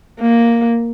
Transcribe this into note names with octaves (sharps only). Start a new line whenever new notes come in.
A#3